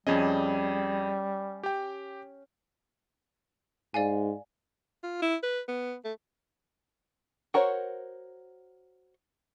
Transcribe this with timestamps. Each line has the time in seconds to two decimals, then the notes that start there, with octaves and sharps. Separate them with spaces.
0.07 F2 G3 C#4 G#4 D#5
1.63 G4 G5
3.94 G#2 D5 F5 G#5
5.03 F4
5.22 E4
5.43 B4
5.68 B3
6.04 A3
7.54 F#4 A#4 C5 C#5